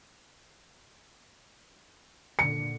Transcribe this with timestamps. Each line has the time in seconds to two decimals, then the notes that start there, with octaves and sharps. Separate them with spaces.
2.39 A#2 D3 C#7